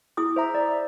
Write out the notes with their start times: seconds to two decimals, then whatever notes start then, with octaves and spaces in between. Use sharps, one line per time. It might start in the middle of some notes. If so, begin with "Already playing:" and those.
0.17 E4 G#4 D#6
0.36 C5 E5 A#5
0.55 D5
0.68 E5